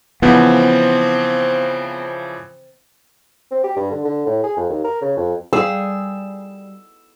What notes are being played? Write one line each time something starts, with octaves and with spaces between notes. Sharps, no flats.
C#3 E3 F3 B3 C4
C4
G4
G2
D3
D3
A2
G#4
F2
D#2
A#4
C#3
F2
G3 G#4 F5 E6